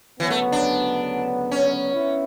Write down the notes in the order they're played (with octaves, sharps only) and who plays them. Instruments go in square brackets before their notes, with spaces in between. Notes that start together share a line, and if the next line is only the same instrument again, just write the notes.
[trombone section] D2 C#3 F#3 B3 [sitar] E3
[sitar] A3
D4
C#4
[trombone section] B3 E4